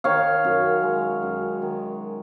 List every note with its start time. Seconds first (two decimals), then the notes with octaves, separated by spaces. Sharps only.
0.04 D#3 C#5 F5
0.44 F#2
0.83 G#3
1.22 F#2
1.62 D#3